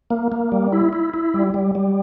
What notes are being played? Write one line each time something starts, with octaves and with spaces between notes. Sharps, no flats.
A#3
A#3
G3
E4
E4
E4
G3
G3
G3